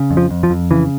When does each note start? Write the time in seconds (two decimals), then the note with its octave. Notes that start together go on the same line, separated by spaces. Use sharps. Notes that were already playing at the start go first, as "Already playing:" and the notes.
Already playing: C#3
0.11 F2
0.17 F3
0.31 F2
0.43 F3
0.50 F2
0.71 C#3 E3